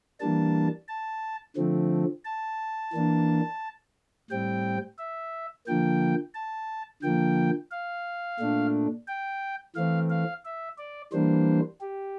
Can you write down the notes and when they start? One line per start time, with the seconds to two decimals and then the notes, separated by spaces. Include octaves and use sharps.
0.20 E3 G3 A#3 D4 A5
0.88 A5
1.56 D3 F3 A3 C4
2.25 A5
2.93 E3 A#3 D4
4.30 A2 G3 C4 G5
4.98 E5
5.67 D3 F3 A#3 G5
6.34 A5
7.02 D3 F3 A#3 G5
7.71 F5
8.40 A#2 A3 D4
9.07 G5
9.76 E3 A3 C4 F5
10.10 F5
10.45 E5
10.78 D5
11.13 E3 G3 A#3 D4 C5
11.81 G4